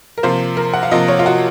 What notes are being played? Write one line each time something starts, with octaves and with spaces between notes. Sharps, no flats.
A#4
C3 F3 A#3 F4 C5
A#4
F#5
F5
C3 F3 A#3 F4 D#5
C#5
F4
F#4